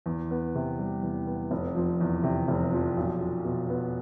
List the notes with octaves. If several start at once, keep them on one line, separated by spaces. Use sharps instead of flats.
E2
B3
C3
G3
E2
B3
F1
F3
E2
C3
F1
F3
B1
F4
B2
B3